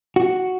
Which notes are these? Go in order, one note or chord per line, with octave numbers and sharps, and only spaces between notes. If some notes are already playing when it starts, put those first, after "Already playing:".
F#4